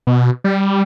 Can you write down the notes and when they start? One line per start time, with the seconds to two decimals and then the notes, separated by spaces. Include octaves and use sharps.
0.07 B2
0.44 G3